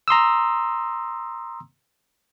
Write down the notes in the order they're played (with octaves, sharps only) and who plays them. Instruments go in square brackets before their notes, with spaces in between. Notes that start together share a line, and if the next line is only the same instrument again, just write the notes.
[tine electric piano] A#5 C6 D#6 E6